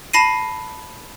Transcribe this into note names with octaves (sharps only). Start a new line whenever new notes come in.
A5 B5 A#6 C7 D#7